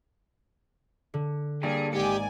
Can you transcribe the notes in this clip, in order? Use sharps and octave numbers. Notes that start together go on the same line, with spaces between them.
D3
G2 G3 A#3 G#4
G#1 G#2 G4 D5 G#5 C#7